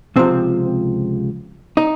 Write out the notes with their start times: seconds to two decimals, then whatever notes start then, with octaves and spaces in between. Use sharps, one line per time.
0.16 C#2 C3 F3 C4
1.77 D#4